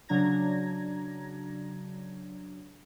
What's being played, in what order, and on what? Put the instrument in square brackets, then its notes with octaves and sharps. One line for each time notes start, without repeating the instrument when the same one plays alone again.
[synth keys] C#3 F#3 D4 A#5 G#6 A#6